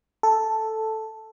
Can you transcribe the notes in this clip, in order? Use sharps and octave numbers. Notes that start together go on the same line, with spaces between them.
A4